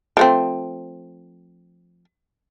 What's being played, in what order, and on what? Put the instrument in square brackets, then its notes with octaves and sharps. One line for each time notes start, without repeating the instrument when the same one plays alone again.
[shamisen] F3 A3 C4